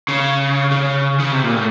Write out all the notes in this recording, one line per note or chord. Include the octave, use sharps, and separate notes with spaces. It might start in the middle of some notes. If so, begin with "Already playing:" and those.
C#3
C#3
C#3
C3
A#2
A2